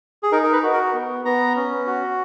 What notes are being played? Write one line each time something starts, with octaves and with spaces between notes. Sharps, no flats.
G#4
D#4 A#4
A#4
B4
F#4
A#4
B3
B3 A#5
C#4
F#4